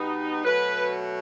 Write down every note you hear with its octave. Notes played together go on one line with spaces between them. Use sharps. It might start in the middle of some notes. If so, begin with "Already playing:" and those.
Already playing: B2 G3 B3 D#4
B2 F#3 A3 B4